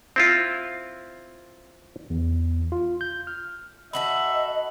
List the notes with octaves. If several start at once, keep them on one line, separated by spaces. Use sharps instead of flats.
C4 E4 F4
E2
F4
G6
F6
D#4 F#4 A4 D#5 E5 B5 F#7